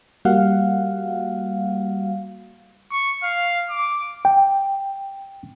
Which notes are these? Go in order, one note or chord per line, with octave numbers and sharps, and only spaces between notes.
G3 A#3 F#4 F5 F#5
C#6
F5
D6
G5